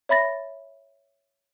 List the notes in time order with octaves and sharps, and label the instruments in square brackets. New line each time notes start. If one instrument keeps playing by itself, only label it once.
[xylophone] C#5 E5 B5 A6 A#6